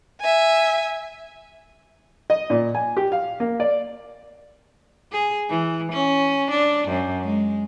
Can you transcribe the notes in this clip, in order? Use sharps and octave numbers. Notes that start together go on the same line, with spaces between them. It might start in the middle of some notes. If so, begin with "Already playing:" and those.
E5 G#5
D#5
A#2
G#5
G4
F5
A#3
D5
G#4
E3
C#4
D4
F#2
G#3